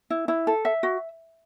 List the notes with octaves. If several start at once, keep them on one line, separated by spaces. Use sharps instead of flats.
E4
E4
A4
E5
F#4